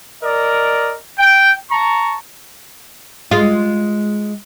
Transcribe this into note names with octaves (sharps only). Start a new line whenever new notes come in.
A#4 D5 D#5
G5
A5 A#5 C#6
G#3 F4